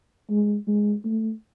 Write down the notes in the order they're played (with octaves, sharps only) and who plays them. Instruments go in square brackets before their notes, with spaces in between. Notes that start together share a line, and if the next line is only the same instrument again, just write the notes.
[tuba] G#3
G#3
A3